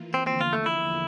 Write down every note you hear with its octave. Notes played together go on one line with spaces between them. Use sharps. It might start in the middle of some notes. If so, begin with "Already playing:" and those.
Already playing: E3 A#3 F4
C4
E2 D3 F3 A#3 C4
F4
A3
E4